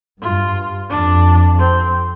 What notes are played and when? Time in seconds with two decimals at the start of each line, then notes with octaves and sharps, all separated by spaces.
0.22 G2 F4
0.90 F2 D4
1.59 C4